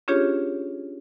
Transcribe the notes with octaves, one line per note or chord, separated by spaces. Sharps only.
C#4 D4 F4 G4 G#4 C#5